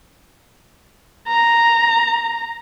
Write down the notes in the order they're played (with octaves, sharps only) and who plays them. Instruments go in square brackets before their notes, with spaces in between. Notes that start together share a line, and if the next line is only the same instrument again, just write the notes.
[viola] A#5